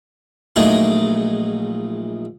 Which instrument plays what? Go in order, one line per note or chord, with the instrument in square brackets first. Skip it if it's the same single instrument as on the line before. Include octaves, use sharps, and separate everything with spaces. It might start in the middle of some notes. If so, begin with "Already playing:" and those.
[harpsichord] A#1 A#2 F#3 A3 D#4 G#4